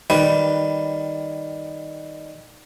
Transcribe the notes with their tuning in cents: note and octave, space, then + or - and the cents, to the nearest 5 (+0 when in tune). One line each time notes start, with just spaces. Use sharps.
D#3 +0 G3 +0 B4 +0